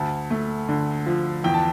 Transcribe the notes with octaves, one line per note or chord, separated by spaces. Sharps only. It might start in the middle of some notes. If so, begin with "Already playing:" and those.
Already playing: D2 A5
A3
D3
F3
E2 G5
A5